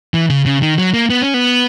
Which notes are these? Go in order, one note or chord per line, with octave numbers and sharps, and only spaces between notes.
E3
C#3
C#3
D#3
F#3
A#3
B3
C#4
B3